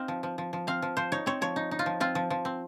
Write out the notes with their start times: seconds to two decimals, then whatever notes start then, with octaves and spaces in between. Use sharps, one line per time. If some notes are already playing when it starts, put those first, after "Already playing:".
Already playing: C4 D#4 F5
0.08 F3
0.23 F3
0.38 F3
0.53 F3
0.67 C4 F5
0.82 F3
0.97 F3 C5
1.12 D#4 C#5
1.26 C4 C#5
1.41 F3 C#5
1.56 D#4
1.71 D#4
1.79 F4
1.86 F3
2.00 C4 F4
2.15 F3
2.30 F3
2.45 C4